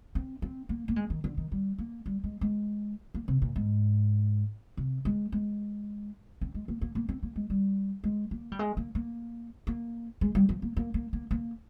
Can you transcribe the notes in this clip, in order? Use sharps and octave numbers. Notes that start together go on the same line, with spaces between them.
C4
C4
A#3
A#3
G#3
D#3
D3
D#3
G3
A#3
G3
G#3
G#3
A#3
C3
A#2
G#2
C3
G#3
G#3
C4
G#3
A#3
A#3
A#3
C4
A#3
G#3
G3
G#3
A#3
G3
G#3
A#3
A#3
A#3
G#3
G3
F3
A#3
A#3
A#3
A#3
A#3